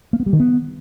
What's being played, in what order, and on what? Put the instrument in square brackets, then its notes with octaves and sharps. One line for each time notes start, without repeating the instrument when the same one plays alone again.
[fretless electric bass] A#3
B3
G3
D#3
B3